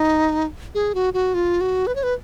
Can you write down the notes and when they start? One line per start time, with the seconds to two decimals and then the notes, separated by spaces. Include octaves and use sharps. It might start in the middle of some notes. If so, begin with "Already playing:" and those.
Already playing: D#4
0.75 G#4
0.95 F#4
1.14 F#4
1.34 F4
1.61 F#4
1.87 B4
1.95 C#5
2.03 B4